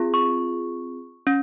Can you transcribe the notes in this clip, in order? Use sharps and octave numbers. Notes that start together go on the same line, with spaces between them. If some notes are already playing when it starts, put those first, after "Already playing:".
Already playing: C4 F4 G#4
C#6
C#4